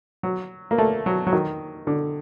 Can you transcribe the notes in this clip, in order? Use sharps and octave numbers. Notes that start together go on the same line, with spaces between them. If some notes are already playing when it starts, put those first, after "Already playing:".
F#3
A#3
A3
F#3
F#3
D#3
D3